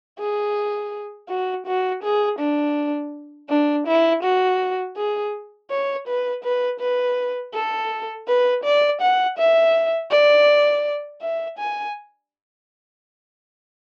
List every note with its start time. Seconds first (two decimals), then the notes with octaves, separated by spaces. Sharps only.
0.19 G#4
1.29 F#4
1.67 F#4
2.03 G#4
2.39 D4
3.50 D4
3.87 E4
4.23 F#4
4.97 G#4
5.71 C#5
6.08 B4
6.44 B4
6.81 B4
7.54 A4
8.28 B4
8.64 D5
9.02 F#5
9.39 E5
10.11 D5
11.22 E5
11.59 G#5